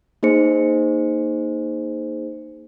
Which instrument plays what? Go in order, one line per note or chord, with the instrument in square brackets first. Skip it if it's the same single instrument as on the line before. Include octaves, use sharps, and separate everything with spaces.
[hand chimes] A#3 D#4 G#4 C5 C#7